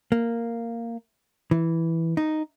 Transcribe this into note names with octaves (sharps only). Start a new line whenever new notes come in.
A#3
E3
D#4